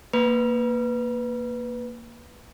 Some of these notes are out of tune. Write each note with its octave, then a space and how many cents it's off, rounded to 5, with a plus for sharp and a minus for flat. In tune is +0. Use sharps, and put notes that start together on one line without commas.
A#3 +0 B4 +0 A#5 +40